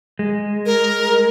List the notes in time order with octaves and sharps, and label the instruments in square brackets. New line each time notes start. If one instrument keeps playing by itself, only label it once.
[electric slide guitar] G#3
[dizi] A#4